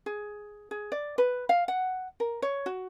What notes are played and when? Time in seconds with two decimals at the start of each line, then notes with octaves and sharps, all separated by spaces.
0.06 G#4
0.71 G#4
0.92 D5
1.18 B4
1.49 F5
1.68 F#5
2.20 A#4
2.42 C#5
2.66 F#4